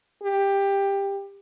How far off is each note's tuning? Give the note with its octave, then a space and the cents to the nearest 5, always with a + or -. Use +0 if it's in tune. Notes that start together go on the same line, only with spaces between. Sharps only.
G4 +15